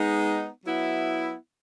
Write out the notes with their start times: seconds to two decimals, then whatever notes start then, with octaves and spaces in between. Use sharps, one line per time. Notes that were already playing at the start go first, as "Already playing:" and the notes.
Already playing: G#3 B3 D#4
0.66 F#3 B3 E4